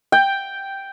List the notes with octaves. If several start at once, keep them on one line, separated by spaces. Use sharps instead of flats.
G5